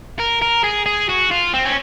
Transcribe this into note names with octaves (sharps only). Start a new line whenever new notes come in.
A#4
A#4
G#4
G#4
F#4
F4
C4
C#4